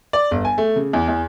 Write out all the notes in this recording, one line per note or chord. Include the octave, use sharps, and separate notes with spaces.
D5
G1
G#5
A3
C#3
E2
E2